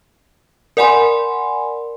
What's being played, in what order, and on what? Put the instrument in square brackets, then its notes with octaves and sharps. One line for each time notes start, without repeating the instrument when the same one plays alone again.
[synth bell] A#4 D5 F#5 G#5 B5 C6